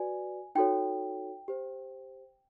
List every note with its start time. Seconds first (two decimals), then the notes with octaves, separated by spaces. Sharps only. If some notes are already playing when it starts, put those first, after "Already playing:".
Already playing: F#4 B4 D5 G#5
0.55 D#4 F#4 A4 C#5 G5
1.48 G4 C5